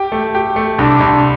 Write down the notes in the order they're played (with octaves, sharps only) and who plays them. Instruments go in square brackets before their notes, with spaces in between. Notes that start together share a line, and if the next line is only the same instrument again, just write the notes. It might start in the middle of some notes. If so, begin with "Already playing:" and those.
Already playing: [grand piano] G4
A3
G4
A3
[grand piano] C2 [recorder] D4
[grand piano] C2